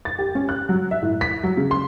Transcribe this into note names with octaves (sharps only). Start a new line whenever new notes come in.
A6
G4
C#4
F#6
F#3
E5
A2
B6
F#3
C#3
C6